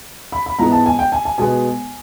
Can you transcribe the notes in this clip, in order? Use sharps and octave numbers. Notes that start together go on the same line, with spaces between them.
B5
B5
G#2 E3 G#3 B3 A#5
A5
G#5
G5
G#5
G#5
B2 G#3 B3 G#5